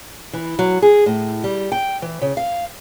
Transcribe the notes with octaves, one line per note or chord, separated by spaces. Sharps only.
E3
F#3
G#4
A2
G3
G5
E3
C#3
F5